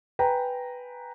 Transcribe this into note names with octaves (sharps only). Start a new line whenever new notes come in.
B4 G5 G#5 A#5